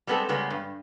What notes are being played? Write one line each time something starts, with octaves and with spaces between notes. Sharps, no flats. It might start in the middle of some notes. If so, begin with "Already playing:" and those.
G3 G#3 B3 C4 A4
C#3 G3 G#3 A#3 B3
G2